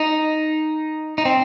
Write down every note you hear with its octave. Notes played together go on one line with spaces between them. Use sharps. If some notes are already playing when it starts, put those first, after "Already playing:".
Already playing: D#4
D#4
C4